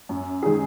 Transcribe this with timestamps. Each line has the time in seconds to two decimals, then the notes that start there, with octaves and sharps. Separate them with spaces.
0.09 F#2
0.43 D#3 G#3 D#4 G#4